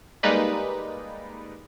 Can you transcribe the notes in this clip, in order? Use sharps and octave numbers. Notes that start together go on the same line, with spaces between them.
G3 G#3 A#3 D#4 B4 D5